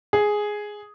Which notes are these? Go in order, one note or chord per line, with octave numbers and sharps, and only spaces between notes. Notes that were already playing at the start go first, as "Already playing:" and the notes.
G#4